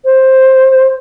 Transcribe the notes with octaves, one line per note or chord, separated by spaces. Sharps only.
C5